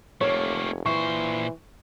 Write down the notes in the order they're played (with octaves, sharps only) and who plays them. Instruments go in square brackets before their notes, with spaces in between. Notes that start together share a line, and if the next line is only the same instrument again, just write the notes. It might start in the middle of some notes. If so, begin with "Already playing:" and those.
[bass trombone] F1 [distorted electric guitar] A3 A#3 [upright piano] C#5
[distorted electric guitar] A#2 C5 [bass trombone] E3 [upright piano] C#6